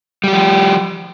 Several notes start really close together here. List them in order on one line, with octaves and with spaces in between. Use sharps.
G3 G4 F3